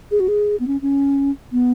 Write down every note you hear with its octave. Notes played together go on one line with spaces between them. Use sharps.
G#4
F#4
G#4
B3
C#4
C#4
B3